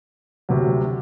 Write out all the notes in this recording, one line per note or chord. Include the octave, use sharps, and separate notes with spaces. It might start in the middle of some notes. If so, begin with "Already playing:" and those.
D2 C3 F#3